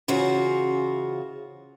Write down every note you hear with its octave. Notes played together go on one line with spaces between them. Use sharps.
C#3 E3 F4 F#4 G#4 C5